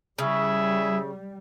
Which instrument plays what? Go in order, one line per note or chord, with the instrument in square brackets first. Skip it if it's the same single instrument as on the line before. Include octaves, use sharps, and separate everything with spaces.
[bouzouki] C#3 [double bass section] G3 [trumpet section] E4 G#4 E5